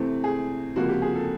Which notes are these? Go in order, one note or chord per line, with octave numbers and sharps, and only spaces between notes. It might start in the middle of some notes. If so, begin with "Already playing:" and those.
Already playing: C3 E3 A3 C4
G#4
C#2 C3 F3 A#3 F#4
G4
G#4
A4